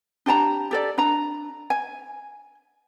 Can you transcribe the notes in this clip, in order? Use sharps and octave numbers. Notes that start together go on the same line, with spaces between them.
D4 G4 A5 A#5
G4 A4 D5
D4 A#5
G#5